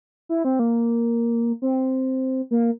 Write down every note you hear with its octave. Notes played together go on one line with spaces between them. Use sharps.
E4
C4
A#3
C4
A#3